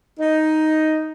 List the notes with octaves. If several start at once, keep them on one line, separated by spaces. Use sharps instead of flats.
D#4